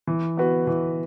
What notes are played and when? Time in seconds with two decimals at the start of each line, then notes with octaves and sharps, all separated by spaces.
0.07 E3
0.37 B3 F#4 B4
0.67 E3